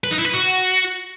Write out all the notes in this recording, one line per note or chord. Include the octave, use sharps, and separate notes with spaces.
B4
D#4
E4
B4
F#4